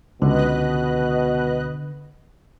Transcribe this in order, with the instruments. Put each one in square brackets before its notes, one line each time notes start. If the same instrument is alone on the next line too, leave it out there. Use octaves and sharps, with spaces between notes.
[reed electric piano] C#2 [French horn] B2 [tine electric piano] D3 [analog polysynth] B4 D#5 F#6